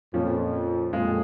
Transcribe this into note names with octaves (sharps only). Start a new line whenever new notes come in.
F2 A#2 F3 C#4
F2 A#2 G#3 F4 G#4